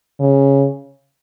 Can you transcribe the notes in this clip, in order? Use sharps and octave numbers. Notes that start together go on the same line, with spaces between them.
C#3